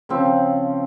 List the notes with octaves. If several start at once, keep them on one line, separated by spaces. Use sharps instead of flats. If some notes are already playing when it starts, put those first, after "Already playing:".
C#3 F3 C4